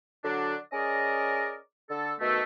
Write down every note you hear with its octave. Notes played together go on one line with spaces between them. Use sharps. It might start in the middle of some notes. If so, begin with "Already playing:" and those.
D3 F#3 D4
C#4 G#4 A#4 D5 D#5
D3 A4
B2 D#3 A3